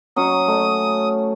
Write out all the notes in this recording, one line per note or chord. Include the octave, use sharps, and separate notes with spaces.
F#3 C#4 C#6 D#6
A3